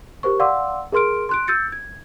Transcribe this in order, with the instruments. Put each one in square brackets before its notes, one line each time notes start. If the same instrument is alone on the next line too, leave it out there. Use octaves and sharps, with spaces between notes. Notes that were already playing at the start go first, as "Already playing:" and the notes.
[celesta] G4 A#4 C5 C#6
D5 F5 F#5 C6 D6 E6
G#4 A#4 C6 F6 D7
C6 F#6 D7
E6 G6 A6 C#7
G#6